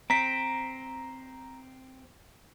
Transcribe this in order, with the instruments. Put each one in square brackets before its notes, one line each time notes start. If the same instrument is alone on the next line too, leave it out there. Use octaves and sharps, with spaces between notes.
[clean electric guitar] C4 [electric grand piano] A#5 B6